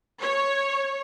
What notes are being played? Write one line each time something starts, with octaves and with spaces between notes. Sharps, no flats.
C#5